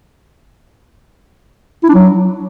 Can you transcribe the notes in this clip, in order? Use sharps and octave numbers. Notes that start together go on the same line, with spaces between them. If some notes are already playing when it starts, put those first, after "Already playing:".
E4
D4
F#3